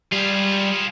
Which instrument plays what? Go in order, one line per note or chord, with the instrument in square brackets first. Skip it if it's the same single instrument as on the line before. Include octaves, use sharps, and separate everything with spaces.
[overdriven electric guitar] G3 [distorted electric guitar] F4 G#4